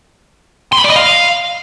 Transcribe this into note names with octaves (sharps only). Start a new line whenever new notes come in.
C6
B5
D5
D#5
F5